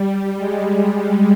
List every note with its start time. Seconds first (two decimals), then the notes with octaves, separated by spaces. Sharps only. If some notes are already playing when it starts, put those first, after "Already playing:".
Already playing: G3
0.37 G#3